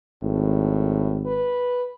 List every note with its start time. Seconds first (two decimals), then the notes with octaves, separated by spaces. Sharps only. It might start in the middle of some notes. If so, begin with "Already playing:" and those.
0.23 G#1 A2
1.26 B4